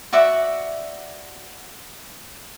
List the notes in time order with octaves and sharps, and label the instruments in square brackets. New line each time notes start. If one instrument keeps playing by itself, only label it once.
[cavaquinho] F#4 D5 E5 F#5